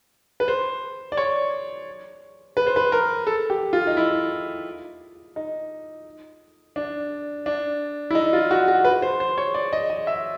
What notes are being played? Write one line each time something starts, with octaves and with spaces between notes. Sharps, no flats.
B4
C5
D5
C#5
B4
C5
B4
A#4
A4
G4
F4
D#4
E4
D#4
D4
D4
E4
D#4
F4
F#4
F#4
B4
C5
C5
C#5
D5
D#5
D#5
E5